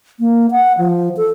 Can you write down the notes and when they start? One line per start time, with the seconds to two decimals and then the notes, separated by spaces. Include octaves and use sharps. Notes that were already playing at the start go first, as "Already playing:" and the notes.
0.20 A#3
0.51 F#5
0.78 F3
1.17 A4